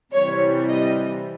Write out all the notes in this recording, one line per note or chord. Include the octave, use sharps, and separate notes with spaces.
C3 E3 G3 C#5
D#5